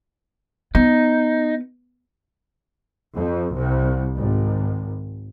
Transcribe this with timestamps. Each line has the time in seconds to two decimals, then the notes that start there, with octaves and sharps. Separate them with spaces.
0.75 B3 D#4
3.14 F2
3.55 C2
4.17 G#1